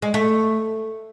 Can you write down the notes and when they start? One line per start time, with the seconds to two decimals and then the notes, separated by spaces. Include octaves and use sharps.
0.02 G#3
0.14 A3